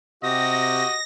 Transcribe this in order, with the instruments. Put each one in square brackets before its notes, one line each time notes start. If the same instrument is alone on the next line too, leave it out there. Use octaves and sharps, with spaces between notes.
[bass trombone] C3 [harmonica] F#4 G4 [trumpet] D#5 [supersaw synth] A#6